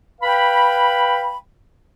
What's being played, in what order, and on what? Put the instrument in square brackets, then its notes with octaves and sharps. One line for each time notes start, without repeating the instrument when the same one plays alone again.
[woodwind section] B4 F5 G5 B5